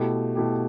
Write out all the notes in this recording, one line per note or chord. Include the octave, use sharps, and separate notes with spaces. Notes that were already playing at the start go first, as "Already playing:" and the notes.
Already playing: B2 A3 E4 G4
B2 A3 E4 G4